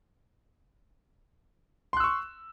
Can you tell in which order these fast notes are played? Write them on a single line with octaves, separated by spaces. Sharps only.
C6 F#6 E6 C#6